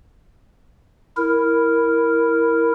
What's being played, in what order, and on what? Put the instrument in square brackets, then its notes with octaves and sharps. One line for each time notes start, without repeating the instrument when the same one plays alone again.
[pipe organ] E4 A#4